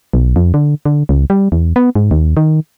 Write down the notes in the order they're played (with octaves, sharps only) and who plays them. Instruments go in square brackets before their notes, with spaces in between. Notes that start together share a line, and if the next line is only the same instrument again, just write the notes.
[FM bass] B1
F2
D3
D3
C#2
G3
E2
B3
G#2
D#2
D#3